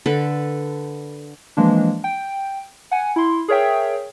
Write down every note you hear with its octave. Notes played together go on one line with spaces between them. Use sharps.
D3 A4 B4
E3 F3 G#3 A#3 D4
G5
F#5 G#5
E4 C6
G#4 A#4 C#5 E5 G5